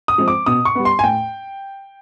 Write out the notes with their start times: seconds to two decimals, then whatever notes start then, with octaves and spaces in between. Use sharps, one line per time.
0.08 D#6
0.18 F3 G#3 C4
0.28 D6
0.46 B2 D#6
0.65 C#6
0.75 G3 B3
0.85 C6
0.99 G#5
1.04 A2 G5